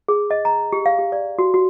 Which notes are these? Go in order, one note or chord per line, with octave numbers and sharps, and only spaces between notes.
G#4
D#5
A#5
G4
F5
G4
D5
F#4
F#4